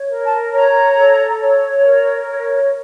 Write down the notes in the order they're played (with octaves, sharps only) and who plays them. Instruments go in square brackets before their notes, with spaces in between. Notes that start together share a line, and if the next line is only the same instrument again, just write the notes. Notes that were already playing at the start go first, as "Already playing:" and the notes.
Already playing: [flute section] C#5
A#4
A5
C#5 A#5
A4
C#5
A#4
C#5